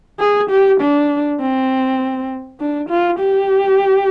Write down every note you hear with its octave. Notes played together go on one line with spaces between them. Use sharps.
G#4
G4
D4
C4
D4
F4
G4